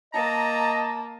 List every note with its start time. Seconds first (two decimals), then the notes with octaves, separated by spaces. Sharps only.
0.14 A#3 D#5 A5 A#5